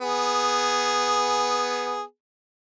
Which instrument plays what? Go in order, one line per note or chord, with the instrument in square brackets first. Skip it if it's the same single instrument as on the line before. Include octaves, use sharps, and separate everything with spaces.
[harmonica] B3 G#4